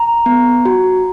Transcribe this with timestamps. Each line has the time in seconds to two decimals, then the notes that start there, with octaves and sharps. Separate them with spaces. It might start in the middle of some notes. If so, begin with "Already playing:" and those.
Already playing: A#5
0.26 B3
0.65 F#4